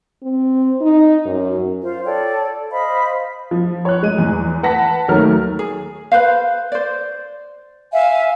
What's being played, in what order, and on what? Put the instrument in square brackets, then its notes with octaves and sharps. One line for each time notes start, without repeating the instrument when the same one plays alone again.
[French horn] C4
D#4
F#2
[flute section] F4 C5 F5
A4 C#5 D5 G5
C5 D#5 F5 B5
[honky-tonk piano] F3
C#5 F#6
G#3 D#7
E2
B4 F#5 A5 A#6 B6
D#2 F#3 A3 A#4 C#5 F6
[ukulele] G#4
B4 C5 F5
C5 D5
[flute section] E5 F5 G#5